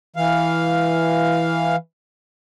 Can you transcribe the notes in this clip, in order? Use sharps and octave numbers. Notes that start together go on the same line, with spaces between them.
E3 F5